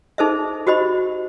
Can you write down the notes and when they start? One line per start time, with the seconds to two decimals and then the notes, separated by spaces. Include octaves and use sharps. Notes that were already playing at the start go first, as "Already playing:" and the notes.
0.18 D#4 G#4 A4 C5 D#5 E5
0.67 F#4 G4 C5 D#5 B5